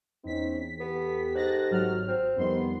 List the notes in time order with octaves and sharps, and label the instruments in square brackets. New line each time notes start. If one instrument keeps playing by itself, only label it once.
[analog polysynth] E2 B6 [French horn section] C4 C#4 D#4
[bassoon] B3 [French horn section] G4 A4
[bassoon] G#2 [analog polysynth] F#6 A6 A#6
[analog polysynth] G#1 F#3 F6
[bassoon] C4
[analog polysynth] F2 D#3 C6 [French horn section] G3 B3